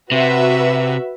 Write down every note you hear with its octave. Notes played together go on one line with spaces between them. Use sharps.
C3 F#4 B4 E5